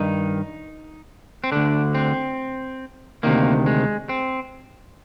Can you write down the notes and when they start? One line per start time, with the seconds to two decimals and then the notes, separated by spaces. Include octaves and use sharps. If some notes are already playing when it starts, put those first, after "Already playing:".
Already playing: G2 D#3 D#4
1.44 C4
1.52 D2 D3 D4
1.95 C4
3.23 D2 C3 D#3 A#3
3.66 G#3
4.09 C4